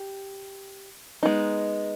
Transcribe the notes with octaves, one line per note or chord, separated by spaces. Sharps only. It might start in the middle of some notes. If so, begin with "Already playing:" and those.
Already playing: G4
G#3 B3 D#4